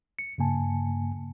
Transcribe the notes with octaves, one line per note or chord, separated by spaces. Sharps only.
C#7
G2 C#3 A#3 G#5 A5